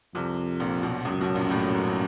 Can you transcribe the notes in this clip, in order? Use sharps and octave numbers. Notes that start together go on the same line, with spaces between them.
C2 F2 C3
A#1 A#2
B1 B2
C#2 F#2 C#3
B1 B2
A#1 A#2
A1 A2
G#2